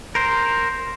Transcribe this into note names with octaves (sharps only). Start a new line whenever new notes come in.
A#4 C5